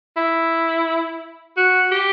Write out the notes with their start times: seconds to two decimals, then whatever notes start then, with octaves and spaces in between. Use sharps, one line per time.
0.17 E4
1.57 F#4
1.91 G4